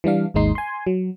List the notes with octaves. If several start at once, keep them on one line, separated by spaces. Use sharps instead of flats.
E3 G3 D4 F5
G#1 D#2 G#3 D#4 C6
G#5 C6
F#3